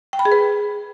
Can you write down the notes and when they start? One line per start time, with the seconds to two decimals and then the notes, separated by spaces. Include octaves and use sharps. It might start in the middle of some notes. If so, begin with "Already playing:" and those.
0.13 G5
0.19 B5
0.25 G#4
0.32 B4